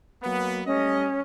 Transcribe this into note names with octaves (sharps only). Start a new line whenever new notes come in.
F#3 A#3 B3
G3 A3 C#4 D#5